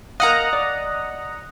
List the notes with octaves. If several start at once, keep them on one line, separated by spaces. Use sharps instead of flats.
A#4 D#5 F5 F#5 A#5 D#6 F#6
D5